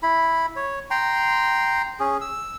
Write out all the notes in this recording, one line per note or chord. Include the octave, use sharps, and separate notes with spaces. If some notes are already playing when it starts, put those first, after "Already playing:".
E4 B5
C#5
G5 A#5 C6
C#4 G#4
E6